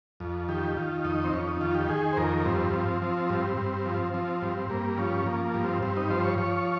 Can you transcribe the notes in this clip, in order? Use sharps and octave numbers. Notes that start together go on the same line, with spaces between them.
F2
D#3 G4
D#3 F4
F2 D#4
C4
F2 C#4
D#4
D#3 F4
G4
D#3 G#4
C5
F2 A#4
G2 C4
F3
F3
G2
G2
F3
F3 C4
G2
G2 A#3
F3 C#4
F3 A#3
A#3
G2
C4
G2 C4
D#4
F3 C5
C#5
F3 C#5